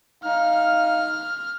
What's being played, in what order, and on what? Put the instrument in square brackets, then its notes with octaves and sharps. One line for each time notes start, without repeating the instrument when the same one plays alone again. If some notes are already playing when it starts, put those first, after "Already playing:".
[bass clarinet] D#4 [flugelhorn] F5 [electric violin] F6